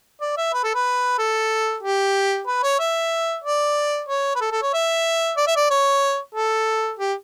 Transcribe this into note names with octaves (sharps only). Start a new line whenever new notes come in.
D5
E5
B4
A4
B4
A4
G4
B4
C#5
E5
D5
C#5
B4
A4
A4
C#5
E5
D5
E5
D5
C#5
A4
G4